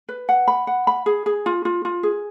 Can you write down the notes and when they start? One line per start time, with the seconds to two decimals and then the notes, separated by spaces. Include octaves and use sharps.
0.09 B4
0.29 F#5
0.48 B5
0.67 F#5
0.87 B5
1.06 G#4
1.26 G#4
1.46 F4
1.65 F4
1.85 F4
2.03 G#4